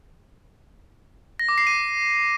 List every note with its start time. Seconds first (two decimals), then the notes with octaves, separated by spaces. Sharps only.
1.39 A#6
1.49 D6
1.58 C7
1.67 D#7